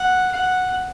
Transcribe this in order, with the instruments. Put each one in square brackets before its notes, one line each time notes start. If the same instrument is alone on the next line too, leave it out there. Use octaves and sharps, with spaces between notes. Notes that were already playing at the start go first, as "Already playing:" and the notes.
Already playing: [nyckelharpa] F#5
F#5